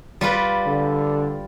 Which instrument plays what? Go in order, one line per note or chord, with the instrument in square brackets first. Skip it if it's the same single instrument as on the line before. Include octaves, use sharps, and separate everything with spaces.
[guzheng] G3 F4 B4
[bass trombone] D3